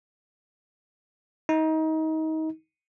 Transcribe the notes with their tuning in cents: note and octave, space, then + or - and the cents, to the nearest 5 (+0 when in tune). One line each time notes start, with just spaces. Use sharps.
D#4 +25